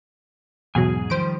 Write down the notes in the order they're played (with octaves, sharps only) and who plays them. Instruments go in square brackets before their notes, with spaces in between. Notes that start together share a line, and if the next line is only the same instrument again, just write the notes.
[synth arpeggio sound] E2 B2 F#3 [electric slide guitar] G#2 G#4 G#5
[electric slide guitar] D#3 F3 G3 [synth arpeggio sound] C5 D7